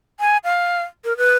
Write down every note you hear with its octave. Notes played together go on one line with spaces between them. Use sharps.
G#5
F5
A#4
B4